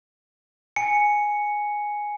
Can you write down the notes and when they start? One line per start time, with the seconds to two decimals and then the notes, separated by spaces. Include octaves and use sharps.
0.76 G#5 C#7